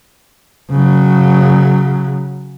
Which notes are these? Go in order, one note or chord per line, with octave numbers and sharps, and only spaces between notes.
C#3 F#3